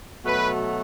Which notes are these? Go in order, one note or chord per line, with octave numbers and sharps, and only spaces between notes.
B2 F#3 A3 B4